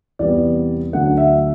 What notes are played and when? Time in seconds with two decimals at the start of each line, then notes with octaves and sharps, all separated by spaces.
0.19 E2 C3 E3 G3 B3 D5
0.93 D2 D3 F#3 F#5
1.18 E5